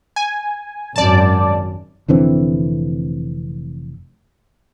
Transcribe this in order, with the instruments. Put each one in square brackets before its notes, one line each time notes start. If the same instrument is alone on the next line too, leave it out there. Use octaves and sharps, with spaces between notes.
[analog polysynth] G#5
[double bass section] G#1 F#2 [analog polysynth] D5 A5
[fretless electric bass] F1 D3 E3 C4